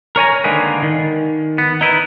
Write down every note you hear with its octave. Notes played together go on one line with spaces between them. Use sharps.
A#4 C#5 G#5 A#5
D3 D#3 G#3 A#3 G#4 B4
D#3
B3
D#4 E4 B4